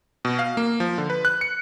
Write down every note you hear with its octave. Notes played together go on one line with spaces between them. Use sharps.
B2
F5
A#3
F3
D3
B4
F#6
C#7